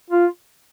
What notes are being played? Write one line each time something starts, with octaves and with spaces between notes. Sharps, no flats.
F4